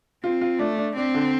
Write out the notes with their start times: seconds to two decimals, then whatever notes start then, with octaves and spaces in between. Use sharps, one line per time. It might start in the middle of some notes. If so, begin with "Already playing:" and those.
0.24 C4 F4
0.41 F4
0.59 A3 D4
0.78 D4
0.96 C4 D4
1.14 D3